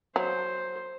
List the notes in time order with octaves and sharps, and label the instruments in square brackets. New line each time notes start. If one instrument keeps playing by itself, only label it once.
[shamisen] F#3 [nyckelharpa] C5